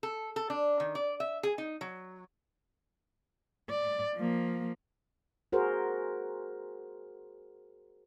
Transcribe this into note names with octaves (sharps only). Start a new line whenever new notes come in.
A4
A4
D4
D#3
D5
E5
G#4
D#4
F#3
D5
F3 A#3
F#4 G#4 A#4 C5